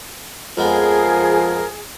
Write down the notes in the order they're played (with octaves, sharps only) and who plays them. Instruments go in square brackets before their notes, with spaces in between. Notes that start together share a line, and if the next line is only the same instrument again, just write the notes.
[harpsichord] F2 G#3 B3 [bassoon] F3 [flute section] G#4 [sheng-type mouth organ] A#4